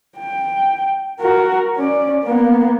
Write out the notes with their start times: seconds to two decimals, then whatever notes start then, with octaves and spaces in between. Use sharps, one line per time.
0.18 G5
1.20 F#4 A#4
1.76 C#4 D5
2.24 A#3 B3